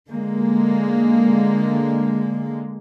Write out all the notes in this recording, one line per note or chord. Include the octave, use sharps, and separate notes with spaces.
D3 G#3 A#3